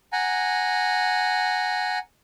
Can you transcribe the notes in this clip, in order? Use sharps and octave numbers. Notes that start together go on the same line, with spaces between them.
F#5 G#5 A#5